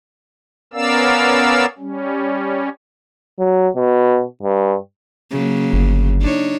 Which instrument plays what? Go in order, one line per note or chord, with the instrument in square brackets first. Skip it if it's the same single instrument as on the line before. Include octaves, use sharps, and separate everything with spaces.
[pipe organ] B3 C#4 A#4 D5 F5 E6
G3 C#4
[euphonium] F#3
B2
G2
[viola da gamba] C#3 F#3 A#3
[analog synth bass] G1
[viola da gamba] D4 D#4 C#5